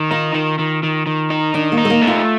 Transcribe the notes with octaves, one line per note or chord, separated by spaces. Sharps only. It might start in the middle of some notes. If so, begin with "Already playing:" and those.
Already playing: D#3
D#4 F4
D#3
D#3
D#3
D#3
D#4
D#3 D4
A#3
D#4
A3
A#3
A3
F4